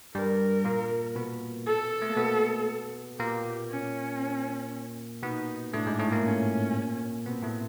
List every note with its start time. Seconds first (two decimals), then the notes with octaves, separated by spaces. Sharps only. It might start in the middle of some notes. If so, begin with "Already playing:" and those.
0.15 G2 G3 A#4
0.65 A#2 A#3
1.16 B2 B3
1.67 A4
2.02 A3
2.10 A#3
2.17 B2 B3
3.19 A#2 A#3 G4
3.70 C#4
5.23 B2 B3 D#4
5.74 A2 A3 D4
5.86 G#2 G#3
5.99 A2 A3
6.12 A#2 A#3
6.25 C#4
7.26 B2 B3 C4
7.43 A2 A3